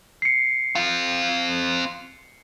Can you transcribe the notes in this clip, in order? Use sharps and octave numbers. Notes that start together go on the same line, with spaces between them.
C7 C#7
C4 F5